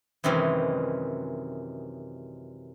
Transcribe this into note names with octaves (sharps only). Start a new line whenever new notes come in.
F#2 C3 D#3 E3 G#3